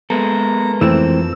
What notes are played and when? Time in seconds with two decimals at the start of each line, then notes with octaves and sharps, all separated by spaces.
0.10 G#3 A#3 B3 A4 A#5
0.81 F2 E3 A3 C4 E6